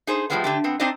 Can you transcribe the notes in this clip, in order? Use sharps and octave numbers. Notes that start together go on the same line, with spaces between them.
D#4 G#4 C5
A2 C3 F3 G3 G#3 B3
D3 A3 G4
B3 C4
C4 D4 D#4 C5 D5 D#5